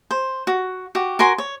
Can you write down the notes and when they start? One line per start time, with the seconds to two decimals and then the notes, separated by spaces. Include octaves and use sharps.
0.11 C5
0.47 F#4
0.95 F#4 G4
1.19 F#4 A#4 G#5 C6
1.38 C#5